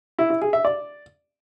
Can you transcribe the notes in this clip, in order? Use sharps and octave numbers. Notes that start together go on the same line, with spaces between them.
E4
E4
G#4
E5
D5